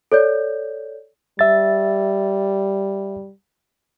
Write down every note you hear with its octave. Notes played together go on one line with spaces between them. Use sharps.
A4 C#5 D5 G6
G3 E5 A6